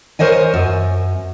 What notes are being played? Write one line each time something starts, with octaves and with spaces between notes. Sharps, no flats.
A#4 C5 C#5 D#5 G#5
F#2